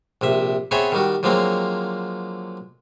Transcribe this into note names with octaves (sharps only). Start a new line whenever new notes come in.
A#1 C3 E5
B3 C4 G#4 A4 C#5 E5
D#3 G3 F#4
D3 F3 F#3 G#3 A#3 C4